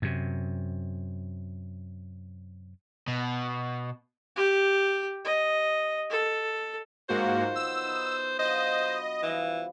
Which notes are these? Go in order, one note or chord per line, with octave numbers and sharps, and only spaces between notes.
F#2 C3
B2
G4
D#5
A4
G#2 D#3 F3 F#3 A#3 F#4 C5
B3 F#4 E6
D#4 E4 B5
F#3 D4 F4 C5 D#5
F#4 B5
E3 F3 G3 F#4